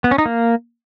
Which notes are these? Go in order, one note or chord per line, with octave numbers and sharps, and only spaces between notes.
B3
C#4
D#4
A#3